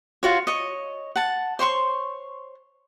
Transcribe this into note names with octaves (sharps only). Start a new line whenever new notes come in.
F4 F#4 C#5
C#5 D#5
F#5 A5
C5 C#5 C6 C#6